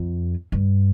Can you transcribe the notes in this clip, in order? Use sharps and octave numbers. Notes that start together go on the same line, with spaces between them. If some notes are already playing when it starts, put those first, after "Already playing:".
Already playing: F2
G2